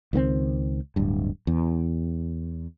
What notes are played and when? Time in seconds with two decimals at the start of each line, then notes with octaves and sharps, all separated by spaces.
0.13 C#2 D#3 A#3 C4
0.96 D1 G2
1.47 E2